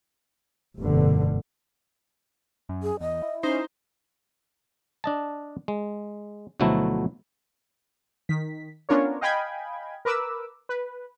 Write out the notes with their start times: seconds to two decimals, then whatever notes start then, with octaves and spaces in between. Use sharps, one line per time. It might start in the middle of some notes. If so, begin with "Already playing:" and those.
0.79 F1 G2 B2 D3
2.69 F#2
2.83 G#4
3.00 E2 D#5
3.22 E4
3.43 C#4 D#4 C5
5.04 D4 D#5 A5
5.68 G#3
6.60 D2 B2 F3 F#3 A3 E4
8.29 D#3 B6
8.89 B3 C#4 D4 F4 A#4 C#5
9.21 D#5 F5 G5 G#5 B5 G#6
10.05 A#4 B4 D6 E6
10.69 B4